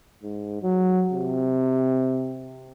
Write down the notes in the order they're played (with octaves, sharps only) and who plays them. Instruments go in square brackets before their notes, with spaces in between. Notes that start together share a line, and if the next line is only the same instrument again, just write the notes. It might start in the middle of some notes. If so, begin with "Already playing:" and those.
[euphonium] G#2
F#3
C3